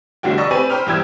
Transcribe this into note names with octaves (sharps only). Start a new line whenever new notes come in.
F1 D3 G3 F#4 G5
D5 D#5 B5 C#6 E6
C4 G4 B4 G#5 D#7
C5 G5 B5 F6
E2 G2 G3 G5 E6 G#6